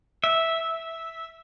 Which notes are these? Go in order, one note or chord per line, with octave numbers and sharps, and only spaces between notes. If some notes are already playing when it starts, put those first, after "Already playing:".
E5